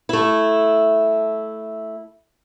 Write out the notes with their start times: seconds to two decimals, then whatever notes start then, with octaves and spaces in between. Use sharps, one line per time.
0.09 A3 E4